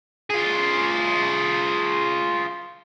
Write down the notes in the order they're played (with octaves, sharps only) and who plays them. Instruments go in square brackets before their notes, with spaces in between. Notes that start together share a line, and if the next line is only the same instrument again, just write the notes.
[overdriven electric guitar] F4 G#4